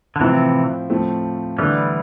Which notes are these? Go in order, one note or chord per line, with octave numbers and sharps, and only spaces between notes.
D3
A2 C3 E3 F3 C4 E4
A2 F3 A3 C4
D3 E3 G3 A3 D4